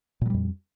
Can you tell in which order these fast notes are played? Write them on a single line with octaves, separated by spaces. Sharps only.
A#2 F#3 G3 F2